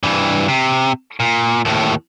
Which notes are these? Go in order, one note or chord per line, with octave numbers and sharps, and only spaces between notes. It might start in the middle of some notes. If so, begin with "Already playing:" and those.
G2 E3
C3
A#2
D#2 A2